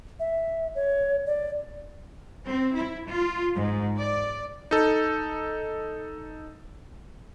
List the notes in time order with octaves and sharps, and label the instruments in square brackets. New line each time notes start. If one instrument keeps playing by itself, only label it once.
[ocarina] E5
C#5
D5
[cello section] C4
E4
F4
G#2
D5
[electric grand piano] D#4 A4